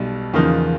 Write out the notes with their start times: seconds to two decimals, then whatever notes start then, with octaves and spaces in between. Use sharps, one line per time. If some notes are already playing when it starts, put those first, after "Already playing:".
Already playing: B1 B2 G3
0.34 E2 C#3 F3 A#3 D#4